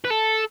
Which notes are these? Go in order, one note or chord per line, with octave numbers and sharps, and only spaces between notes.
B4
A4